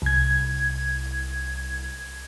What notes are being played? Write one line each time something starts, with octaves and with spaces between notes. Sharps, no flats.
C2 G#6